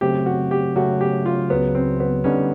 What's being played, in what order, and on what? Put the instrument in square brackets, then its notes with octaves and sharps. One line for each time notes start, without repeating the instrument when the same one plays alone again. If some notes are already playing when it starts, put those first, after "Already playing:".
[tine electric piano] C#3 F#3 A3 C4 [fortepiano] G4
[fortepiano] F#4
G4
[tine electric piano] C#3 F#3 A3 C#4 [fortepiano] F#4
[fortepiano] G4
F4
[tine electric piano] C#2 C#3 F#3 [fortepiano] B3
[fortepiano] C4
B3
[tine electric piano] D3 G3 B3 D#4 [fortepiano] C#4